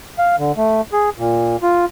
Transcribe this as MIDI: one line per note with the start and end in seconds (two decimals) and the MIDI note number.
0.18 0.36 77
0.39 0.52 50
0.57 0.81 57
0.93 1.10 68
1.18 1.56 46
1.62 1.85 65